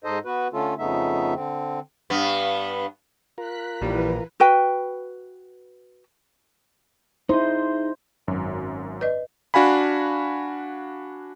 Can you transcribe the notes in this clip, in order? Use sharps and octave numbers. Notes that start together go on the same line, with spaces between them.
G#2 D#4 A4 C5 D#5
B3 F#4 B4
D3 A3 C#4 F4 A4
F2 C#3 A3 B3 D#4 E5
D3 C4
G2 B3
F4 A#4 F#6 B6
A#1 D#2 E3 G3 B4
F#4 B4 G5
D#4 E4 G#4 C5 D#5
G#1 F#2 F#3
B4 D5 D#5
D4 F#4 F5 G#5 B5